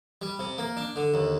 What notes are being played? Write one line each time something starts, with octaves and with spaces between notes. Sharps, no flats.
G3
C3
A#3
D4
D3
D#2